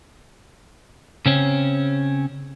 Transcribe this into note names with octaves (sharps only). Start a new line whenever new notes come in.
C#3 C4 C#4